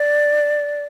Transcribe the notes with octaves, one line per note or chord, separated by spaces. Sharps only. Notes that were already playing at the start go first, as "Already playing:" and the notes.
Already playing: D5